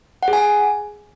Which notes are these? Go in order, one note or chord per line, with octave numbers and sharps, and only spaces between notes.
F#5
G#4
G#5